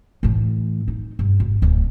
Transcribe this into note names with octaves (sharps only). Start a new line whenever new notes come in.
A2 E3
D#4
G2
G#1
D1 C4